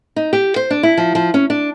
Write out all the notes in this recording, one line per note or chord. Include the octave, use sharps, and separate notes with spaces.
D#4
G4
C5
D4
E4
F3
F3
C#4
D4